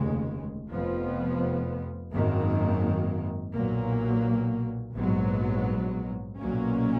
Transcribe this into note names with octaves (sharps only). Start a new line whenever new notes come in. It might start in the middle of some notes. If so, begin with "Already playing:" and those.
Already playing: F1 D#2 C#3 G#3
F1 F2 F3 B3
G#1 F#2 D#3 A#3
B1 A#2 F#3 A#3
A#1 G#2 F#3 B3
B1 A#2 F#3 A#3 C#4